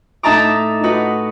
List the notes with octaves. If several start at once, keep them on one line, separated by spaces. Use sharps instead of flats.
A2 D#4 E5 A5 A#5 D6
D#4 F#4 B4